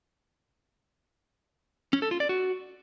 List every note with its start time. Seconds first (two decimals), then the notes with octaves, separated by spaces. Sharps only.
1.93 C#4
2.02 A4
2.11 F4
2.20 D5
2.29 F#4